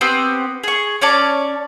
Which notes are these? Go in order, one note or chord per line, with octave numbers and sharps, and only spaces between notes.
B3 C4 G4
G#4 C#6
C#4 C#5 D5 A5